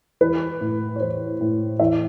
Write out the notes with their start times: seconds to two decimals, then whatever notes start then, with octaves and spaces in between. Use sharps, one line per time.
0.21 E3 B4
0.61 A2
0.96 C#5
1.00 E3 C5
1.40 A2
1.80 E3 E5